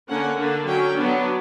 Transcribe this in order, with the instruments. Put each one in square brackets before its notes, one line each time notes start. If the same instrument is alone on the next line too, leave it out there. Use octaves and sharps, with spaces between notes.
[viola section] D3 A#3 C#4 F#5
D3 A#3 D4
F#3 C#4 G5
F#3 B3 D4